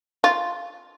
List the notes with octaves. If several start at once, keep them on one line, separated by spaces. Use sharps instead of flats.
F4